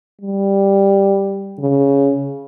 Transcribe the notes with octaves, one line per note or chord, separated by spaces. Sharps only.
G3
C#3